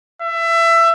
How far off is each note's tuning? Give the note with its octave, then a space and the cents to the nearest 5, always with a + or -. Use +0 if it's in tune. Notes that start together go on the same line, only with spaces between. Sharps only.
E5 +20